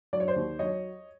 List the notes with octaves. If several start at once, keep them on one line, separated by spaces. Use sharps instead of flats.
F#3 D5
C#5
C5 D5
D#2
F#3 C#5 D#5